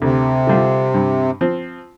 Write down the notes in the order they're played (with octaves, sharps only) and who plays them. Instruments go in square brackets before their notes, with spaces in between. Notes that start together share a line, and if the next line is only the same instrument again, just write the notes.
[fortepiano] D2 [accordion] C3
[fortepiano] D3 G3 D4 F4
G2
F3 C4